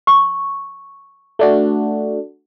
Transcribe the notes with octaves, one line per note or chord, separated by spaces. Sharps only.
C#6
A3 D4 F#4